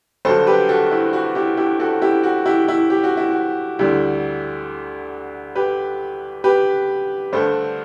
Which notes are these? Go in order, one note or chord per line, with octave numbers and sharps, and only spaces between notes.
G2 D3 F#3 A4 C5
G4 B4
F#4 A4
E4
F#4
E4 G4
E4 G4
F#4 A4
E4 G4
F#4
E4 G4
E4
G4
F#4
E4
F#4
D2 D3 G3 E4 G4
G4 B4
G4 B4
G2 D3 A3 A4 C5